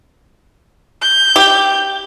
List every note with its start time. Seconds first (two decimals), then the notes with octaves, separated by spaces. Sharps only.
1.02 G6
1.36 G4